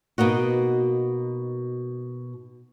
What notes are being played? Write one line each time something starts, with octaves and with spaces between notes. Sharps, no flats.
B2 A#3 D#4 F#4